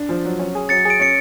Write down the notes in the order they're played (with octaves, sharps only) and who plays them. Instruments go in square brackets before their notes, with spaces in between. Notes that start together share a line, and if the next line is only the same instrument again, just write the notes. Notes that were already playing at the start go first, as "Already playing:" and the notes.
Already playing: [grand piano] D4
F3
F#3
C#4
G#4
[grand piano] F#3 [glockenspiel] A6 C#7
[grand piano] G#4
[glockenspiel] D7
[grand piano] C#4 [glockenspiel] C#7